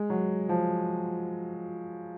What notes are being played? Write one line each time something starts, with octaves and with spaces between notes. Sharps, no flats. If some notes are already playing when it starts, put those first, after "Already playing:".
Already playing: G#3
F#3
F3